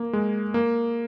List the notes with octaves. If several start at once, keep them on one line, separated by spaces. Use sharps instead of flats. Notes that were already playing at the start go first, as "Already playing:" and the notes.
Already playing: A#3
G#3
A#3